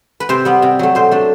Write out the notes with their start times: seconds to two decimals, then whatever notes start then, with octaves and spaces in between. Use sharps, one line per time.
0.20 B4
0.29 C3 C5
0.45 G3 B3
0.62 C3
0.79 F#3 A3
0.95 B2 C5
1.11 A3 D4